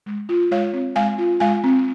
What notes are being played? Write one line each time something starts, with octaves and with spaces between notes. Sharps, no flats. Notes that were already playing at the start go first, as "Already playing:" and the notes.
G#3
F4
G#3 C#5 F5
C4
G#3 F5 G#5
F4
G#3 F5 G#5
C4